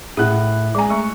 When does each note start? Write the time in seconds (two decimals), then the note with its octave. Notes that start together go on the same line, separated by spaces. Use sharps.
0.17 A2 G#4 F#5 F#6
0.75 G#3 G#4 G#5 A#5
0.90 A3 C#6